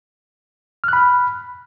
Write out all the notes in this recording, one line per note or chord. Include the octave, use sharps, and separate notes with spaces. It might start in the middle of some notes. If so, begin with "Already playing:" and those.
B5 F6 F#6